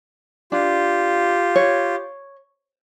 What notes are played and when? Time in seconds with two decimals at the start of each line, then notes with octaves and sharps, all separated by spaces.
0.52 D4 F4 G4
1.56 C#5